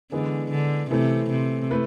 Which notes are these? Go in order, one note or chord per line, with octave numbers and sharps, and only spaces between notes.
D3 E3 G#3 B3 D4 G#4
D3
C3 E3 A3 C4 E4 A4
C3
A3 E4 B4